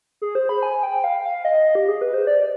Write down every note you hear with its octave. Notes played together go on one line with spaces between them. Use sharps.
G#4
C5
B5
G#5
G5
F5
F5
D#5
G4
G#4
B4
C5
D5